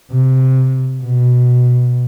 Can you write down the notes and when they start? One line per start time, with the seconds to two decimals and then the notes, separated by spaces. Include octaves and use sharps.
0.11 C3
1.03 B2